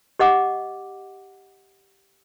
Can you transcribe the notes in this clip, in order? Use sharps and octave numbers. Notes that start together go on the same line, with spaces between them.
G4 D#5 F#5 D6